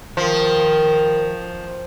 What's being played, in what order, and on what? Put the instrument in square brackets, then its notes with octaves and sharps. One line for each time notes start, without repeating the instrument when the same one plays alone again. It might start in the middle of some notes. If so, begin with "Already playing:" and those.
[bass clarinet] D#3 [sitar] F3